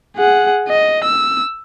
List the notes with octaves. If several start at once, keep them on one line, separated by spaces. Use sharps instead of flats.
G#4 F#5
D#5
E6